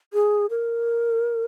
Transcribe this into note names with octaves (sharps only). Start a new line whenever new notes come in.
G#4
A#4